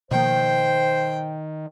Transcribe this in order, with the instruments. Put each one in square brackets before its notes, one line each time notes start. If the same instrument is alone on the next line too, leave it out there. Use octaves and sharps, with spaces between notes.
[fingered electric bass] B2 F3 A#3 [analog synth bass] D#3 [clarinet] C5 [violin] G5